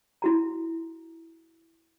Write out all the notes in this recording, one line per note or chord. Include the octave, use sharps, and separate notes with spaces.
E4 F#4 A#5